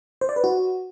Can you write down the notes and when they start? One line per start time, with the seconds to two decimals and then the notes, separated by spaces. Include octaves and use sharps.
0.21 C5
0.29 D5
0.36 B4
0.44 F#4